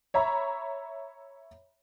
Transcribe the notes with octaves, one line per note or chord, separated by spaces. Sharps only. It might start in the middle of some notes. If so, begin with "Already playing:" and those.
C#5 E5 A#5 B5